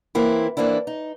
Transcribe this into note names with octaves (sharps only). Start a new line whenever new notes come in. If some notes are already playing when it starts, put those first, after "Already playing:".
E3 A#3 C4 E4
E3 A#3 C4 D4 E4
D#4